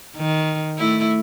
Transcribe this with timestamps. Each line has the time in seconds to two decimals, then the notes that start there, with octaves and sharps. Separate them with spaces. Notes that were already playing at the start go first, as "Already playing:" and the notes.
0.16 D#3
0.78 A3 E4